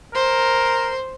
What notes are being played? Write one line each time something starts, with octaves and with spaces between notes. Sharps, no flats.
A#4 C5